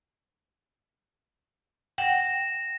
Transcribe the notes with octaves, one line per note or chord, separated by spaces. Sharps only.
F#5 G5 A#6 E7